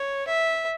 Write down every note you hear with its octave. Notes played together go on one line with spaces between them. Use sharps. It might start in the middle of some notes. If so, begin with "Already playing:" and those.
Already playing: C#5
E5